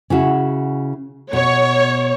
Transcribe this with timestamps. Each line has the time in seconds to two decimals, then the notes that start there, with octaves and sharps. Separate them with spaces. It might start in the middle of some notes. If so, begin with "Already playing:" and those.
0.10 C#3 E4 F#4
1.33 B2 C#5